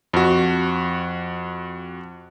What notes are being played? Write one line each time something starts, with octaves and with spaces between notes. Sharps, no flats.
F2 F#4